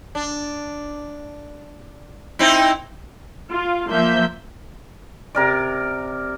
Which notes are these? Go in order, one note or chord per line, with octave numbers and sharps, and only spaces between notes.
D4
C4 D#4 E4
F4
F3 A#3 E5 G6
C3 A#4 D5